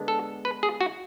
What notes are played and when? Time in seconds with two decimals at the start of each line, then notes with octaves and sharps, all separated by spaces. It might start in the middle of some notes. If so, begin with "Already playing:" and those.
Already playing: D3 G#3 B3 D4
0.08 A4
0.45 B4
0.63 G#4
0.81 F#4